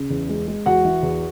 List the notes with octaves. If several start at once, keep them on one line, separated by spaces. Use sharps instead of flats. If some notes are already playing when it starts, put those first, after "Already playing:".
Already playing: C#3
E2
G#3
G#3
E2 F#4 F#5
E3
E2